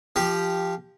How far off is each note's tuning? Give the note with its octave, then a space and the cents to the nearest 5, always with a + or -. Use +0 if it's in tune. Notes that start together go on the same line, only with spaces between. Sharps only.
F3 -10 G4 +0